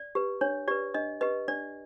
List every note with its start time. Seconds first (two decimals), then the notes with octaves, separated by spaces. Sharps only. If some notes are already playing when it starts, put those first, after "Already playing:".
Already playing: D5
0.15 G4 B4
0.41 D4 C#5
0.68 G4 B4 D5
0.94 D4 D#5
1.21 G4 B4 D#5
1.48 D4 D5